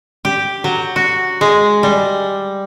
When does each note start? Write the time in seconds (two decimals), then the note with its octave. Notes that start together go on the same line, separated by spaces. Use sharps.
0.25 G4
0.64 F#3
0.96 F#4
1.41 G#3
1.83 G3